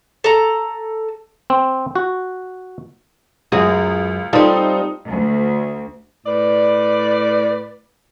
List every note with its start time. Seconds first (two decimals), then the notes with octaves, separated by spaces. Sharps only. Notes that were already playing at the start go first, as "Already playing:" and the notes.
0.24 A4 A#5
1.50 C4
1.95 F#4
3.52 C#2 F#2 F#4 G#4
4.33 G3 C4 D#4 F4 A4
5.09 D2
6.27 A2 B4 D5